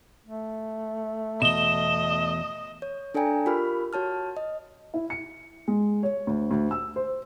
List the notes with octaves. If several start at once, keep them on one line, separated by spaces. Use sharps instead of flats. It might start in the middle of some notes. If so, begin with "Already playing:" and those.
A3
E2 B2 D#5 E7 G7
C#5
D4 A4 D5 G5 G#5 A#5
F4 G4 A#4 B5 F6
F#4 C#5 A5 F6
D#5
E4
C#7
G#3
C#5
D2
D2
E6
C5